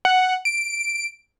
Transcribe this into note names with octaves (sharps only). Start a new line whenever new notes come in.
F#5
D7